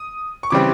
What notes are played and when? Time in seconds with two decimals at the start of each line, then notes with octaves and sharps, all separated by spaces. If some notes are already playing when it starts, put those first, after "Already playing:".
Already playing: D#6
0.43 C#6
0.50 C#3 E3 G3 C4 D6